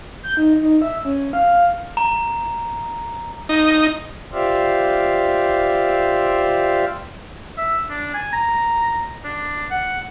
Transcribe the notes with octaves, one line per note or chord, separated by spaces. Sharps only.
G6
D#4
D#4
E5
C#4
F5
A#5
D#4
F4 G4 C5 D5 E5 F5
E5
D4
G#5
A#5
D4
F#5